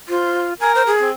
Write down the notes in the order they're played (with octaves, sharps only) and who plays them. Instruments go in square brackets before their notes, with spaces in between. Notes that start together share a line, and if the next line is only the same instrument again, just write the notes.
[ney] F4 [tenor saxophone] C5
[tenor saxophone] A#4 [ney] G#5
[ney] C5
G#4
[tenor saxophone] C4